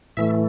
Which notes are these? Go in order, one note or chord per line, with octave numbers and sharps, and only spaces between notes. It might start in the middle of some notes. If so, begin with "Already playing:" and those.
A2 E3 A3 E5